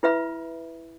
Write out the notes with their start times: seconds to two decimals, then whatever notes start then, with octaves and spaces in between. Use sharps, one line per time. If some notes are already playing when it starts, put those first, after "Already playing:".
0.03 E4 B4 E5 B5